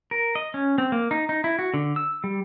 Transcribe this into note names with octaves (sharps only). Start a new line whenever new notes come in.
A#4
D#5
C#4
C4
A#3
D#4
D#4
E4
F#4
D3
E6
G3